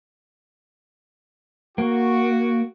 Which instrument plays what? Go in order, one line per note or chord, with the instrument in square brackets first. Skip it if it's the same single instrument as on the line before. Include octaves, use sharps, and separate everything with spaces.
[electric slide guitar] A#3 [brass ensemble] F#4